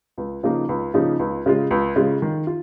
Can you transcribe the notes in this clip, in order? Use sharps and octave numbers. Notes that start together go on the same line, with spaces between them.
C#2
C#3 F3 A#3 D#4
C#2
C#3 F3 A#3 D#4
C#2
C#3 G#3 F4
C#2
C#3 G#3 F4
D#3
F4